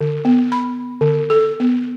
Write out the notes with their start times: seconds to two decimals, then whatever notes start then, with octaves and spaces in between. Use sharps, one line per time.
0.01 D3
0.25 B3
0.52 B5
1.01 D3
1.30 A4
1.60 B3